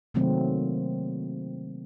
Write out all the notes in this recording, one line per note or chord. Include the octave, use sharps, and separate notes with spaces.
C3 D#3 F#3 A3 A#3 C4